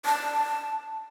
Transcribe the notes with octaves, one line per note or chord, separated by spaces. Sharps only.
A5